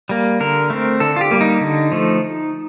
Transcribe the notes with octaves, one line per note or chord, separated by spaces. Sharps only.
G3 A#3
D3 A#4
A3 C4
D3 A4
F4
G4
G3 A#3
D#4
D3
F3 A3